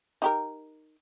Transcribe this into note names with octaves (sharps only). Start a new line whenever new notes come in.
D#4 G4 A#4